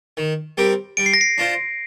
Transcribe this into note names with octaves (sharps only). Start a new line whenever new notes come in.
D#3
G3 C4 G4 A#4
G3 D7
C7
A#6
C7
D4 F4 C5